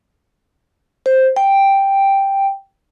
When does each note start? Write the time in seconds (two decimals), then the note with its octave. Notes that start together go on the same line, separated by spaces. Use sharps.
1.06 C5
1.36 G5